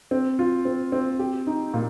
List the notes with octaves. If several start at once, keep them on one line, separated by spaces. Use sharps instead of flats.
C4
F4
C4
C4
G4
D#4
A#2